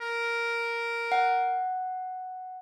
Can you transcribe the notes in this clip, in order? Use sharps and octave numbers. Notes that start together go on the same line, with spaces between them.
A#4
F#5